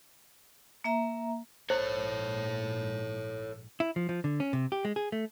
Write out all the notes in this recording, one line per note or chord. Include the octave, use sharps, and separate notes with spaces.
A#3 E5 A#5
A#1 G#2 A4 C5 C#5
E4
F3
F3
D3
C#4
C3
G4
G#3
G#4
A3